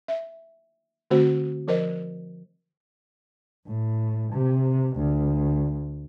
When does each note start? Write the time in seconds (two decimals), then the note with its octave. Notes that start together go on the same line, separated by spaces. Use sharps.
0.08 E5
1.11 D3 A3 C4 F#4 C5
1.68 F3 A#4 C5 D#5
3.67 A2
4.33 C3
4.97 D2